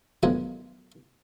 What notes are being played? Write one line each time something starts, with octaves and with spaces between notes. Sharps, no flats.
D3 D#3 F3 F#3 G#3 B3